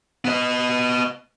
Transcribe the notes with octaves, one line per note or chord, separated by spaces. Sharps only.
B3 D#5